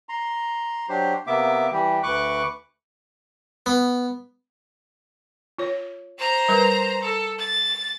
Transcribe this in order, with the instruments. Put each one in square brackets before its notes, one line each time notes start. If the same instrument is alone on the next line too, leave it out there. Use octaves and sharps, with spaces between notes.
[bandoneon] A#5 C6
F#3 D4 G4 C5
C3 A#3 B3 E5 D6
E3 G3 G4
D2 B4 C#6 D6 F#6
[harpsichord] B3
[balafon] F4 C#5
[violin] C5 A#5
[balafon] G3 A#4 B4
[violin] A4
A6